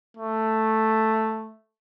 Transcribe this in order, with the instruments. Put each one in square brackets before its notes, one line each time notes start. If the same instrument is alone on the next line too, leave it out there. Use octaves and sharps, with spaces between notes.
[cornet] A3